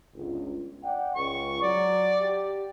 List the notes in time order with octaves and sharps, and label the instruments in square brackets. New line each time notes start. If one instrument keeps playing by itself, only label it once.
[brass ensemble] G1 C#2
D5 F#5 G5
[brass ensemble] C#2 [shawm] C#6
[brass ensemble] F#3 [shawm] D5
[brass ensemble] G4